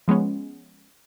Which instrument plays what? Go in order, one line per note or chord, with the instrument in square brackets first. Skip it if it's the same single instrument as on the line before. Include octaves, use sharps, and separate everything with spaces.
[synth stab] F3 G#3 B3 C#4